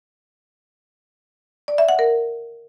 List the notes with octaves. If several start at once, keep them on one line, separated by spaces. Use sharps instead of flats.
D5
E5
F#5
A#4